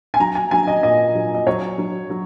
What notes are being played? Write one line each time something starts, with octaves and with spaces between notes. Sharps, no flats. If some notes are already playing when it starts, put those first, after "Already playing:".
G#5
F#3 A#5
G#5
F#3 G#5
D#5
A#2 D#5
F#3
D#5
F#3 C#5
F#3
F#3